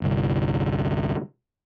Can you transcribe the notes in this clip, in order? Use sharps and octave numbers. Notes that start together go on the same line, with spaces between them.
G1 C2